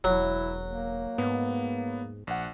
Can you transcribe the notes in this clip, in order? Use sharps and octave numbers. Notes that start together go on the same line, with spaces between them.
E1 F#3 E4
A#3
G#2 B3
A#1 F#5